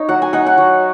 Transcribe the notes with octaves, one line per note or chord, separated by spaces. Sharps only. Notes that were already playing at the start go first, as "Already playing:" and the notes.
Already playing: D#4 C#5 D#5
F#3 F#5
G#5
D#4 F#5
F#5
F#3